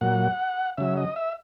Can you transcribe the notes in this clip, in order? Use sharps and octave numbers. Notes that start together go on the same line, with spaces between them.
A#2 F#3 F#5
C#3 F#3 E5
D#5
E5